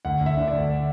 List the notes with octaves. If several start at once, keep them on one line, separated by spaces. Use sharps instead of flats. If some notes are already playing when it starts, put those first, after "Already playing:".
D2 F#5
D2
E5
D3
D5
D2